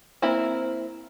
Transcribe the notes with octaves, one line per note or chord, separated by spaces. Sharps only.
A#3 C4 E4 B5